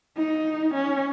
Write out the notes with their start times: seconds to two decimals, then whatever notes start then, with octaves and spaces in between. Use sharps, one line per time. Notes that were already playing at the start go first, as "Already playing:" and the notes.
0.17 D#4
0.74 C#4